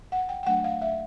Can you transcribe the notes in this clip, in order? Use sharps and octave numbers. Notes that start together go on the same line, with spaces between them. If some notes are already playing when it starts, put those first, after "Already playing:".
F#5
G5
G5
F#3 A3 D4 F#5
F5
E5